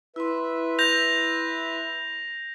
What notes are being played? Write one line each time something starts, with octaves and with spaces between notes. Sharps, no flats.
E4 B4 E5 C6
G6 A#6 F7